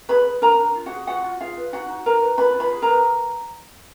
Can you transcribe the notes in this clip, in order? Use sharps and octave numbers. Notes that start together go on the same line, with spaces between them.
G#4 B4 B5
B4
D4 A#4 A#5
D4
F4
F#4 G#4 F#5
F4 F#4 F#5
F4
F4 G#4 F5
B4
D#4 F#4 F#5
D#4
F#4 A#4 A#5
B4
F4 B4 B5
F4
B4 B5
G#4
A#4 A#5
B4